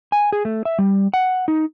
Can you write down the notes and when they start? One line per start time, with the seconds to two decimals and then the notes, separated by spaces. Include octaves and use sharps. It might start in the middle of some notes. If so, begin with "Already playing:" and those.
0.12 G#5
0.32 G#4
0.45 A3
0.65 E5
0.79 G3
1.14 F#5
1.48 D#4